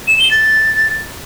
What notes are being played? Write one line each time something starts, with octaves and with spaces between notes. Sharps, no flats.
E7
G7
A6